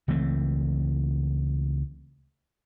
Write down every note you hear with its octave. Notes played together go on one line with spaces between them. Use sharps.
C#2 E3 A3 C4